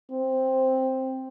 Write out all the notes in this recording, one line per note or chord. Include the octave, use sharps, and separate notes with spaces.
C4